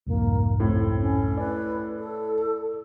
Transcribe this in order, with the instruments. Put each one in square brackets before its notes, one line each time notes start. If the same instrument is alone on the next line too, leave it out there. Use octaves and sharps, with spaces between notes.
[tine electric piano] C2 F2 G#2 [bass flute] A#3
[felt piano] A2 [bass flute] C4
[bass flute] C#4
[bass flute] B4 [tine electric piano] D5
[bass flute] A4